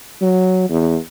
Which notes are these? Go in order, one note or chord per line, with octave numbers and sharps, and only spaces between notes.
F#3
E2